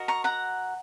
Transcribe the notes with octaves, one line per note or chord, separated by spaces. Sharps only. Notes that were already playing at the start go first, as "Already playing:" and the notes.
Already playing: F#4 A#4 D#5
A#5 C#6
F#5 A#5